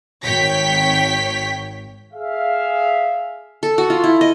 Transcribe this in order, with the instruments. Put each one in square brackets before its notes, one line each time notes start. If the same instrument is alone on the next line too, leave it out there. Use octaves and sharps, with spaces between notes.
[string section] G#1 C#5 G5 B6
[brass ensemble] G#4 E5 F5
[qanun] A4
F#4
F4
E4
D#5